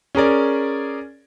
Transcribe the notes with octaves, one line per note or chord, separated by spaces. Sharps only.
C#4 G#4 A#4 D5